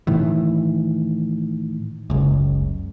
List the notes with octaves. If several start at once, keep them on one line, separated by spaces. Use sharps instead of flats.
A2 D#3 E3
F#1 C#2